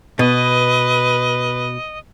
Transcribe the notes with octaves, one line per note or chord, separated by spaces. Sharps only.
B2 B4 D#5